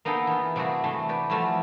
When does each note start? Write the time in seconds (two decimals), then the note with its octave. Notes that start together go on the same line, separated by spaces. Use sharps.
0.05 A#3 B3 D#4 G#4 A4 G5
0.27 E3 F4
0.56 C3 G3 A3 C4 F#4 G#4
0.84 E3 A3 C6
1.09 B4 D5 G5
1.30 E3 F3 G3 A3 F4 F#4